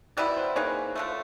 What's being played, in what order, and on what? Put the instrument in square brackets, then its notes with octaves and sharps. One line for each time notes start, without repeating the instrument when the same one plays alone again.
[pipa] B2 G3 B3 E4 [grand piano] D5
[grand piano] C5
[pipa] A#3 D#4 G#4 B4 [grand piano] C#5
[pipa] D3 F3 A3